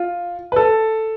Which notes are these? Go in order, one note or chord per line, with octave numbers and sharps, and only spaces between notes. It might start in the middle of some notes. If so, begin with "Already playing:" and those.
Already playing: F4
B4
A4